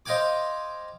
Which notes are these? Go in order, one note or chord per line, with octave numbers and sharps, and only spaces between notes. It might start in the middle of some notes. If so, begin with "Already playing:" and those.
C5 D#5 F5 G5 G#5 D6